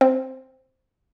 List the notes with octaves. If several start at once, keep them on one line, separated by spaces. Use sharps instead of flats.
C4